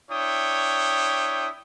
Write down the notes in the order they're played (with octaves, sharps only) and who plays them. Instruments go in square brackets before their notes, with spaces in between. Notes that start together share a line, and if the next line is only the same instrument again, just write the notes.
[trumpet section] D4 E4 C#5 G5 D#6